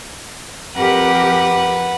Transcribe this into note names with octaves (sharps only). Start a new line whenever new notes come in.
F2 G4 A#4 B4 F#5